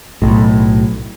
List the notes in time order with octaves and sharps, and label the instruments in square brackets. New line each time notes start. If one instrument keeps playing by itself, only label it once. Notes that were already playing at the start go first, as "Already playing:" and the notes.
[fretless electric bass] B1 A2